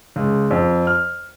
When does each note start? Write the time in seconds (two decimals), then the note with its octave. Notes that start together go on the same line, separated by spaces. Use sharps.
0.16 C#2
0.51 F2
0.87 F6